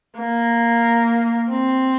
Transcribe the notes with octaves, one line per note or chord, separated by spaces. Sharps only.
A#3
C4